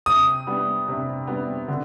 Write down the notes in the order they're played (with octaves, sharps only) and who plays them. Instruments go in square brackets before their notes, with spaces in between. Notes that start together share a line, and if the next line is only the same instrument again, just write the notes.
[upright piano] C3 [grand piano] D#6
[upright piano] G3 B3
C3
G3 B3
D3